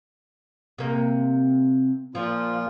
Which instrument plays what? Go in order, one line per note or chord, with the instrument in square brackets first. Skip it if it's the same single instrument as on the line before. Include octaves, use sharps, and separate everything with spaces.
[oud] C3 A#3
[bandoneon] A#2 F4 [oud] F3